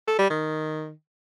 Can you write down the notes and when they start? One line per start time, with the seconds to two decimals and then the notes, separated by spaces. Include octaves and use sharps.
0.08 A4
0.19 G3
0.30 D#3